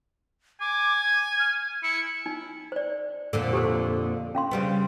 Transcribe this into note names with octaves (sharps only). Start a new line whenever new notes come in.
G#5 D6
G#6
F6
E4 C#7
D#4
C5 D5
F2 A#2 D3
G4 A4 C5
C#4 F5 C6
C#3 G3 B3